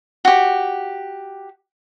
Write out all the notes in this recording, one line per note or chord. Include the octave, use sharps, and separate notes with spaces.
F#4 G4